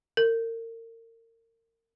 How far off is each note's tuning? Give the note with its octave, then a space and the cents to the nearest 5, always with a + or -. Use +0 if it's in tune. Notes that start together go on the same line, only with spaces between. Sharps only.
A#4 -35